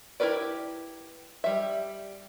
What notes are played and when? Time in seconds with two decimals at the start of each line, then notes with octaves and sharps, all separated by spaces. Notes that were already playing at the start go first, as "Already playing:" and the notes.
0.20 E4 G4 A#4 B4 D5
1.44 G3 E5